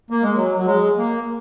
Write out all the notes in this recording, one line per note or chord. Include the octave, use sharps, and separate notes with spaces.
A#3
G#3
F#3
F#3
G#3
A#3